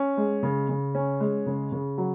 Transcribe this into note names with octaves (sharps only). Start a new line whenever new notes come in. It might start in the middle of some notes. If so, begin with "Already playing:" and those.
Already playing: C#4
G#3
C#3
C#3
C#4
G#3
C#3
C#3
F#3